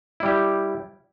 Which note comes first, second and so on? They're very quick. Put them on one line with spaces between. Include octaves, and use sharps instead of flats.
E4 G3 G4